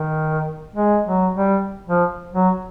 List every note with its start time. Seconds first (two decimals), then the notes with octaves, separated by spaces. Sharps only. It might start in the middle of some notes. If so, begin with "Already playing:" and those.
Already playing: D#3
0.76 G#3
1.06 F#3
1.36 G3
1.88 F3
2.34 F#3